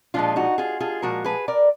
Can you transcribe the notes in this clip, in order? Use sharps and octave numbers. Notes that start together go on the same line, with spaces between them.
A#2 F3 G#3 D4 F4
D#4 F#4
F4 G#4
F4 G#4
A#2 F3 G#3 F#4 A#4
G#4 B4
A#4 D5